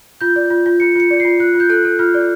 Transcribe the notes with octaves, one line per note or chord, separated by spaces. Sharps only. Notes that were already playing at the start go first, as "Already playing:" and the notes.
F4 G6
D5
F4
F4
F4 C#7
F4 C#7
D5
F4 C7
F4 F#6
F4
G6
A4 F#6
A4
F4 F6
D5